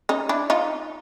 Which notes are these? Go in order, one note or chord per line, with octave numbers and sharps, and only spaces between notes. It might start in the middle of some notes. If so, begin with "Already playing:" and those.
C#4 D#4
D4 E4
D#4 F4